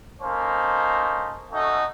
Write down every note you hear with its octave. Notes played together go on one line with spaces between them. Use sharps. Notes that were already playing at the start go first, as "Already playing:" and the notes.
A#3 C#4 D#4 A4 C5
A3 C#4 D#4 F#4 A4